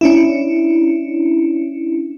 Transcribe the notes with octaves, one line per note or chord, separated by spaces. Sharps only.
C#4 D4 E4